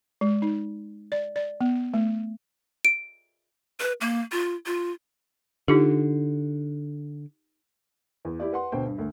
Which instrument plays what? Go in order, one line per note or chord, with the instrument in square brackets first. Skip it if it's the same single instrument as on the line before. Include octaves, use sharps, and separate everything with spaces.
[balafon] G#3
D#4
D5
D5
B3
A3
[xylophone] D7
[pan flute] B4
A#3
F4
F4
[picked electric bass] D3 [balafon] D#4 F4 G4
[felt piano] E2
E4 G4 D5
B4 F#5 C6
D2 B2 C5 G5
G2
D2 A3